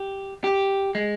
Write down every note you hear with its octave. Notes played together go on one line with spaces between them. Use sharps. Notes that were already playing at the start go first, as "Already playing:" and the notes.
Already playing: G4
G4
G#3